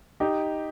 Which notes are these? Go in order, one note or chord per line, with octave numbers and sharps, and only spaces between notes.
D#4 G4